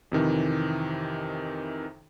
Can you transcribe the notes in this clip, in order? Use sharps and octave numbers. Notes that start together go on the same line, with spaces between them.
F2 C3 D#3 E3